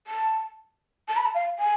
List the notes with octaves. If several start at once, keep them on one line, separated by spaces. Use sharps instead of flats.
A5
A5
B5
A5
F5
G#5